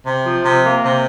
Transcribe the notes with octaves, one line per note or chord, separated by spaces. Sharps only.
C3
F3
C3
A#3
C3